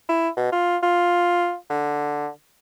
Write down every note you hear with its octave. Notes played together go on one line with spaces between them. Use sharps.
E4
B2
F4
F4
D3